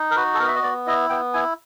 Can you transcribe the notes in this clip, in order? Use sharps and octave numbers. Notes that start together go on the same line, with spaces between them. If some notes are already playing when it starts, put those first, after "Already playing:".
Already playing: D#4
A#4
F#4 B4
A4
B3 A#4
E5
D#5
B3 D5
E4 D#5
B3 G5
E4 G#5